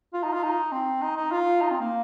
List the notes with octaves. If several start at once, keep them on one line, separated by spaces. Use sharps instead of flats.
F4
D#4
F4
D#4
C4
D#4
D#4
F4
D#4
C4
A#3